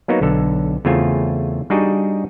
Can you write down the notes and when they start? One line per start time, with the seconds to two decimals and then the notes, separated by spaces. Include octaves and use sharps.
0.08 F#3 A#3 B3 D#4 F#4
0.21 B1 D3 A4
0.85 E2 C#3 A3 C4 F4 G#5
1.70 G3 D4 D#4 F#4 G#4 D#5